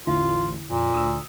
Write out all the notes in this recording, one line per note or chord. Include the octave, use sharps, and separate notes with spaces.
A1 E2 D3 E4 F4
F2 A#2
D2 D#6 E6